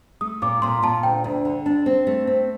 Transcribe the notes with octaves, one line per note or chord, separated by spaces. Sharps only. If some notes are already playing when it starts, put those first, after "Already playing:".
A3 D#6
A#2 D6
A#2 C6
A#2 A5
D2 G5
D2
D3
D4
C4
A3
C4